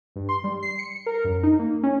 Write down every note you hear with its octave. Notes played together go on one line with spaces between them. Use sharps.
G2
C6
G3
C7
C#7
A#4
F#2
D#4
A#3
C#4